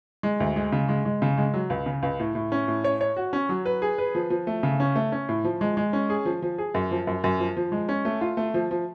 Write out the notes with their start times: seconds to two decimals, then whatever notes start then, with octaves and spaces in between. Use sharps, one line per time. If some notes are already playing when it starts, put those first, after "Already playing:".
0.23 G#3
0.40 D2
0.56 G#3
0.72 C#3
0.88 G#3
1.05 G#3
1.22 C#3
1.38 G#3
1.54 F#3
1.70 C#2
1.86 C#3
2.03 C#2
2.20 A2
2.35 A2
2.52 C#4
2.68 A2
2.84 C#5
3.01 C#5
3.17 F#4
3.33 C#4
3.49 F#3
3.66 B4
3.82 G#4
3.98 B4
4.15 F3
4.30 F3
4.47 A3
4.63 C#3
4.80 C#4
4.96 A3
5.12 C#4
5.29 A2
5.44 F3
5.61 G#3
5.77 G#3
5.93 C#4
6.10 G#4
6.25 F3
6.42 F3
6.58 G#4
6.74 F#2
6.91 F3
7.07 F#2
7.24 F#2
7.40 F3
7.56 F3
7.72 G#3
7.89 C#4
8.05 A3
8.21 F4
8.37 A3
8.54 F3
8.71 F3